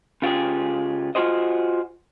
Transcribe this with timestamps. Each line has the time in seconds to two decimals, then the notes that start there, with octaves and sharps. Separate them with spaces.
0.22 C#3 F4 G4 G#4
1.15 F4 F#4 G#4 C5 D#5